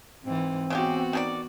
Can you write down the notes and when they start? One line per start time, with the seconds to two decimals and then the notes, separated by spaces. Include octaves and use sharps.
0.24 G#2 E3 C4
0.70 C#3 G#3 B3 F#4 G4
1.13 D#3 G#4 D5